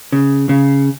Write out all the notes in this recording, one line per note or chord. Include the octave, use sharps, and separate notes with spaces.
C#3
C#3